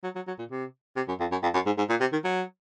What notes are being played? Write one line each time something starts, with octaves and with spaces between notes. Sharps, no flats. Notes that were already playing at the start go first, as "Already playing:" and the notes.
F#3
F#3
F#3
A#2
C3
C3
F#2
F2
F#2
F2
F#2
G#2
G#2
A#2
C3
D#3
F#3